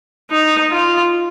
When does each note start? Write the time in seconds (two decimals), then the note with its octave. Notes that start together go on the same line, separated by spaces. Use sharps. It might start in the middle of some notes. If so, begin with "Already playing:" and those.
0.30 D#4
0.71 F4